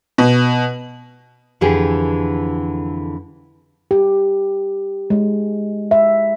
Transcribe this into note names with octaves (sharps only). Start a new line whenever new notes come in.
B2
F2 D3 E3 G4 G#4
G4
G#3
E5